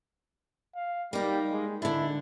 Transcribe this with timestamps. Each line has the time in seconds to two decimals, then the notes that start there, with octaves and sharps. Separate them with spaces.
0.76 F5
1.13 G3 A#3 D#4
1.52 G#3
1.82 D3 D4 E4